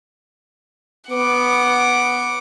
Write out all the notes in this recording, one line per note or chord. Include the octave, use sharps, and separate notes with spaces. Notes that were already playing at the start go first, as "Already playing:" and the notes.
B3 F#5 D6